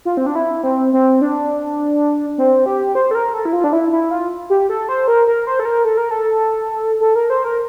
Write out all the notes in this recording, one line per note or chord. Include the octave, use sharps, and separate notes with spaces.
F4
C4
D4
E4
C4
C4
D4
C4
G4
C5
A4
A#4
A4
E4
F4
D4
E4
E4
F4
G4
A4
C5
A#4
A#4
C5
A4
A#4
A4
A#4
A4
A4
A#4
C5
A#4